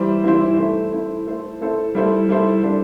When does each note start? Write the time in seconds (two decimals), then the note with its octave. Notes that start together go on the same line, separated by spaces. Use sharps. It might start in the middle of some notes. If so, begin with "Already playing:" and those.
Already playing: E3 G3 E4 C5
0.24 E3 G3 E4 C5
0.57 A3 E4 C5
0.92 A3 E4 C5
1.27 A3 E4 A4 C5
1.61 A3 E4 A4 C5
1.95 G3 E4 A4 C5
2.29 G3 E4 A4 C5
2.63 G3 D4 A4 C5